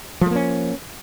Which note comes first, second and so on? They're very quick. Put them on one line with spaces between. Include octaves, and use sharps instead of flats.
F3 A3 A#3 C#4